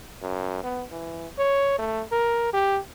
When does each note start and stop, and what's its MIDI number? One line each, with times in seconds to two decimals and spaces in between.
0.22 0.63 42
0.63 0.84 59
0.92 1.27 52
1.38 1.74 73
1.79 2.03 57
2.12 2.53 70
2.54 2.79 67